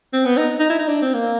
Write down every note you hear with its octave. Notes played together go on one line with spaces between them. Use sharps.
C4
B3
D#4
D#4
E4
D#4
D4
C4
A#3